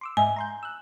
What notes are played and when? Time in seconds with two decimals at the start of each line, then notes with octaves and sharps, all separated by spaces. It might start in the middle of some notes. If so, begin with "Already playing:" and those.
0.01 C6 D6 E6
0.17 G#2 D#5 E5 G#5
0.36 A#5 C6 G6
0.63 E6 F#6